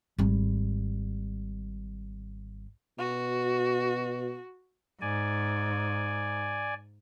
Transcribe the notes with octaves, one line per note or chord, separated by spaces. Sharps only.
G#1 G3
B2 F#4
G#2 D5 G#5